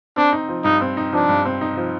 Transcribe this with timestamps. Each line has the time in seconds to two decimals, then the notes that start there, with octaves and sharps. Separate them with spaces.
0.16 C4 D4
0.33 D#4
0.49 F3
0.64 G2 D#4
0.81 C4
0.97 D#4
1.13 F3 D4
1.29 G2
1.45 C4
1.61 D#4
1.77 F3